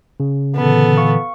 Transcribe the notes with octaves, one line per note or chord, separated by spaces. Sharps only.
C#3
A#2 D3 E3 B3 A4
F5 C#6